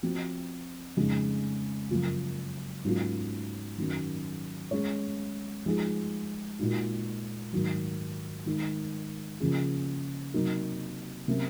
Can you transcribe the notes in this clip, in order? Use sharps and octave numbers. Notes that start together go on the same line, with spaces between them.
F3 C4 F#4
F2 C#3 G#3 D#4
F#2 C#3 F3 A#3 F4
G#2 F#3 A#3 C#4 F4
F#2 D#3 F#3 C#4
G#3 C#4 G#4 C#5
F3 G#3 D#4 G#4
A#2 G#3 D#4 F#4
G#2 D#3 F#3
D#3 G#3 D#4
C#3 F3 A#3 C#4 G#4
C3 F#3 A#3 D#4
C3 F#3 A#3 C#4